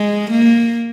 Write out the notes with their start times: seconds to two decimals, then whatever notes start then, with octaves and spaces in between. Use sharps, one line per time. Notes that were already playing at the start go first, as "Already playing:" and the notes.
Already playing: G#3
0.31 A#3